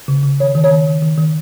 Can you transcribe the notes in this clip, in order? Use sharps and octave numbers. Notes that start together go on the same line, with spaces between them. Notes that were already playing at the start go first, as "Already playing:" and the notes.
C#3
C#3
D#3 C#5
D#3
C#5
D#3
D#3
D#3
D#3